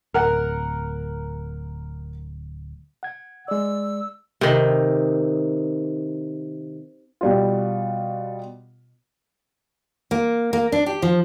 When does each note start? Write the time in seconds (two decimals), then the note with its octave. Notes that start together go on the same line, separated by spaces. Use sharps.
0.14 D1 A#4 F#5
3.03 F#5 G#6
3.48 G#3 D5 E6
4.41 C3 D#3
7.21 B2 G3 F4
10.11 A#3
10.53 A#3
10.72 D4
10.86 G4
11.02 F3